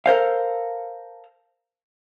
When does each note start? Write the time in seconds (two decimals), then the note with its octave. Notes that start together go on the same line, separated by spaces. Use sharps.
0.06 A4 A#4 C5 F5